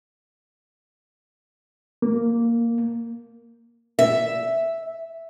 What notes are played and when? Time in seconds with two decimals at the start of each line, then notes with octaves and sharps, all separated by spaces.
2.02 A#3
3.99 E5